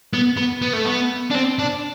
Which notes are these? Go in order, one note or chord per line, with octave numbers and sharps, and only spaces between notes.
B3
B3
B3
A3
B3
D4
C4
D4